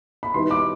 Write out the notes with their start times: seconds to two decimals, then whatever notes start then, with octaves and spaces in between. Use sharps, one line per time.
0.23 B5
0.34 D#3 G3 B3 E4 C6
0.51 D6